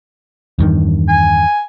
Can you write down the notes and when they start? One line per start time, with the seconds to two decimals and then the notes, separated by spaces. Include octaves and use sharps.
0.59 E2 G2 D#3
1.08 G#5